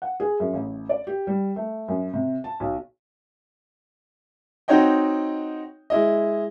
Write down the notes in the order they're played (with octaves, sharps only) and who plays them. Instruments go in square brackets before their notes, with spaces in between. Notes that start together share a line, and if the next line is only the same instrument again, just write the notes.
[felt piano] F#5
G#4
F#2
A1
D5
G4
G3
A3
F#2
C3
A5
B1
[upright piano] C4 D#4 F#4 C#5 D#5 G5
G#3 E4 D#5